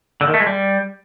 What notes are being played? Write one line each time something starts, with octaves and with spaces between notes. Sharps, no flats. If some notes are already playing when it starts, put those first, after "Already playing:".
D3
D#3
A3
G#3
G3